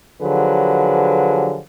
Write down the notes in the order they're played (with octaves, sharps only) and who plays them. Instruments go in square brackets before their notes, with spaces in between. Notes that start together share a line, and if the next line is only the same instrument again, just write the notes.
[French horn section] D3 F3 F#3 G4 G#4 B4